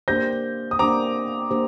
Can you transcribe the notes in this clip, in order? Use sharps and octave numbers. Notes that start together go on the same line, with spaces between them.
A#3 D4 G4 C5 G6 A#6
D#6
A#3 D4 G4 C5 A#5 D6
A#3 D4 G4 C5